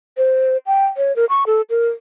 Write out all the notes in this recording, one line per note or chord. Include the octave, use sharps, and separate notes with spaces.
C5
G5
C#5
A#4
C#6
A4
A#4